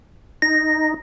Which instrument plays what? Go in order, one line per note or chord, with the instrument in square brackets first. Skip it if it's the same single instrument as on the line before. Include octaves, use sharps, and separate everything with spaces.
[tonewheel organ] D#4 [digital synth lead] A#6